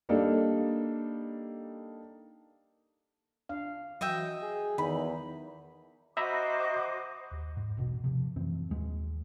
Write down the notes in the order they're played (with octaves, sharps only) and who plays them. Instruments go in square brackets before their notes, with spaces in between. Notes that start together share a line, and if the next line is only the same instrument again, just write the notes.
[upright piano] G3 A#3 D4 D#4 A4
[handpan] D4 F5
[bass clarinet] E3 [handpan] F#3 [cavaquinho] D#5 E5 G5
[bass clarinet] G#4
[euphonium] E2 [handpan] D#3 [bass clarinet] D#4 [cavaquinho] B5
[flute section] F#4 C5 D6 [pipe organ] D#5 [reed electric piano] E5 A#5 B5
[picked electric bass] D#2
G#2
E1 A1 B2
C3 F3
F#2 A2 E3 C4
D#2 G#3